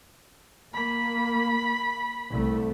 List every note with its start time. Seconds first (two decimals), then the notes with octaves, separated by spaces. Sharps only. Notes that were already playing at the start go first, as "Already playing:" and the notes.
0.74 A#3 B5
2.29 C2 A3